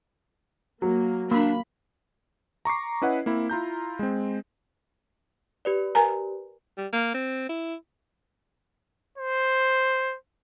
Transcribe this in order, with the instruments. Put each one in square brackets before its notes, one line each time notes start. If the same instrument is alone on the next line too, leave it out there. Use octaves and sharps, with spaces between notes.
[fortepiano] F#3 [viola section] A#3
[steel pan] A#3 [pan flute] D4 [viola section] B5
[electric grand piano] A#5 C#6 D6 C7
C#4 E4 B4 D#5 F#5
A#3 C4 E4
E4 F4 A#5 G6
G#3 C4
[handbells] G4 B4 D5
[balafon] A#4 G#5 A#5
[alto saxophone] G3
A#3
C4
E4
[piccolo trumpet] C5